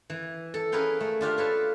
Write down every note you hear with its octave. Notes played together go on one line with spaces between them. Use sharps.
E3
A4
C#4 G#4 A#4 B4 F5 G5
A3
D4 F4 G4 F5
A4 B4 C#5 A5